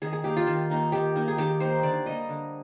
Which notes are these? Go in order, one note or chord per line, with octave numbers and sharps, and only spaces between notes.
D#3 G#4
G#4
A#3 D#4 G4
F4
D#3
A#3 D#4
D#3 G4
A#3 D#4
G#4
D#3 G4
A#3 D#4 C5
D3 D5
G3 A#3 D#5
D3